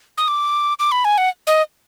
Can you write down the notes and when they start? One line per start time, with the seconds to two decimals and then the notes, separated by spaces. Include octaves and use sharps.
0.18 D#6
0.28 D6
0.79 D6
0.92 B5
1.05 G#5
1.18 F#5
1.47 D#5